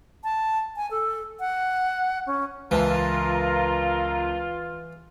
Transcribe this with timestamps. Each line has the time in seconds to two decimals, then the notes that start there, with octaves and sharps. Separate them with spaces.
0.24 A5
0.77 G#5
0.91 A4
1.40 F#5
2.27 C#4
2.71 C#2 E3 F4 A#4 A5